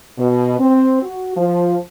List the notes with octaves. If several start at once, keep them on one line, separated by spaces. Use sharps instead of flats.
B2
C4
F#4
F3